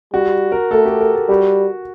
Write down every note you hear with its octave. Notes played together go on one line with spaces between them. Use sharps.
G3 F#4
A#4
A3 A4
G4
A#4
A4
G3 F#4